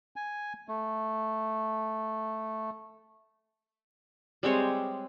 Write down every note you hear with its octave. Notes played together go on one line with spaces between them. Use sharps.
G#5
A3
G3 G#3 C4 C#5